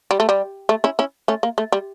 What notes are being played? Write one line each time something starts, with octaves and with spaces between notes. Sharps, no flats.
G3
A3
G3
A3
C#4 E4
C#4 E4
A3 C#4
A#3
A3
G3